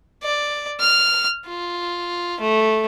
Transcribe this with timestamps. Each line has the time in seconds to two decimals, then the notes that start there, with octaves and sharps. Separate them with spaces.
0.23 D5
0.80 F6
1.46 F4
2.40 A3